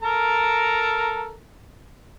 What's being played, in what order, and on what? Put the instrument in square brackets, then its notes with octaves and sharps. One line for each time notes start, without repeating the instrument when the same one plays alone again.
[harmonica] A4 A#4 A#5